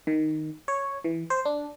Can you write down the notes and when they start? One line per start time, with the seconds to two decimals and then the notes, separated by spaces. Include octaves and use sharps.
0.07 D#3
0.68 C#5
1.04 E3
1.30 C5
1.45 D4